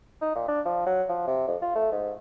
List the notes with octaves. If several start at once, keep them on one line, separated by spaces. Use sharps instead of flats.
D#4
A#2
D4
F3
F#3
F3
C3
F2
F4
A3
G#2